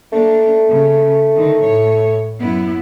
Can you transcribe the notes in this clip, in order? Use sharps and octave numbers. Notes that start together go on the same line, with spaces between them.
A3 A#3 D4
C#3
D3 D#3
A2 C#5
F#2 B3 E4